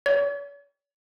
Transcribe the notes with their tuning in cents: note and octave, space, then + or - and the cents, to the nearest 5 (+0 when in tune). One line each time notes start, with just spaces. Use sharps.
C#5 +45